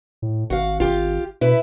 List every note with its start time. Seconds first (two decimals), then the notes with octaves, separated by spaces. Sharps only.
0.22 A2
0.50 G#1 F#4 F5
0.80 G#1 F4 G4
1.41 B2 E4 B4